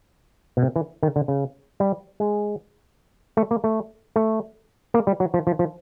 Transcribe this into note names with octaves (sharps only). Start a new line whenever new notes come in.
B2
C3
E3
D#3
D3
C#3
G3
G#3
A3
A#3
A3
A3
A#3
G3
F#3
F3
F3
F3